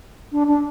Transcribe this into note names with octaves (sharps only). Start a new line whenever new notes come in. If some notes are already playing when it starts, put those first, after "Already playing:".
D4
D4